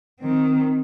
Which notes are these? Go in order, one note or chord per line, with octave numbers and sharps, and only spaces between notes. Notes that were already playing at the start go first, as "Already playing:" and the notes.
D#3 C4